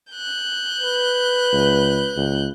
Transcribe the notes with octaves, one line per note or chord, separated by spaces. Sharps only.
F#6 G6
B4
C#2
C#2